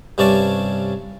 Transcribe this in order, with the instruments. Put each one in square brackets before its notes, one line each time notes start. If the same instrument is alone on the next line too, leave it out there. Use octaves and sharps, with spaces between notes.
[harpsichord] G2 C3 C#4 D4 D5 A5